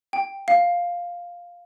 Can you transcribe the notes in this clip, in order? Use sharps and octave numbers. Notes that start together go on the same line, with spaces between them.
G5
F5